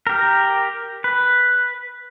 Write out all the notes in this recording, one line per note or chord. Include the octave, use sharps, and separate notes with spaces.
G4 A#4
B4